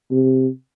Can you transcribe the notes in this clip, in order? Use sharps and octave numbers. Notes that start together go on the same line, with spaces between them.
C3